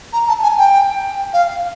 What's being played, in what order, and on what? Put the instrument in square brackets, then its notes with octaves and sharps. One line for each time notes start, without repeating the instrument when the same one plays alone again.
[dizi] A#5
A5
G#5
G5
F5